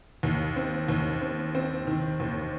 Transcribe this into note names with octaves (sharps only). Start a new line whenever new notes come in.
D#2
C4
D#2
C4
C4
D#3
D#2